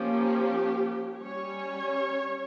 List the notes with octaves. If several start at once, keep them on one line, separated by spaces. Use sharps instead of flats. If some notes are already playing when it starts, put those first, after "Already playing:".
Already playing: F3 A#3 C#4 G4
G3 C#4 C#5